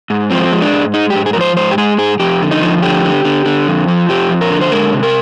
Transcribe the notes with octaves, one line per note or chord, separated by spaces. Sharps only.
G#2
F3 C4
G#3
D4
G#2
G#3 D#4
G4
G#2
G#4
A#4
F3 C5
G#2 C5
G4
G#3 G#4
G#2 G#4
F2 G4
D3
D#4
F3
D3 G4
D3
D3
D3
F2
F3
F2 G4
F3
A#4
D3
C5
G#3 A#4
C3
A#4